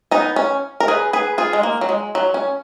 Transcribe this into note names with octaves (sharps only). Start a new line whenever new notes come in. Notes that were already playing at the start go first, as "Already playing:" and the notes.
B3 D#4
C#4
A#4
G#4 B4
G#4 B4
F4 G#4
G#3
A#3
F#3
G#3
F#3
C#4